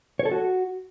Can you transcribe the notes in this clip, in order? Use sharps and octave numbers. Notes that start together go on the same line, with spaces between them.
C#5
A4
F#4